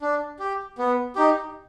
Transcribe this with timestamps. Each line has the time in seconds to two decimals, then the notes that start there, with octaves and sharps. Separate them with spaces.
0.01 D4
0.39 G4
0.78 B3
1.16 D#4 G4